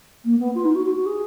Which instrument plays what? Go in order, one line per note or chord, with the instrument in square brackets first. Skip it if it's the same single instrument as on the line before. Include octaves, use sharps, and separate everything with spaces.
[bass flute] A#3
B3
F4
D#4
F#4
F#4
F#4
G#4